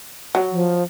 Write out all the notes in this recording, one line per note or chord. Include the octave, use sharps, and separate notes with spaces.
F#3
F3